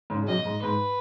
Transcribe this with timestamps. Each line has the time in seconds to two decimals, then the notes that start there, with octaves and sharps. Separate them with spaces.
0.10 G#2 C#3
0.22 C#3
0.27 F#2 B2 D#5
0.45 G#2
0.62 G#2 B4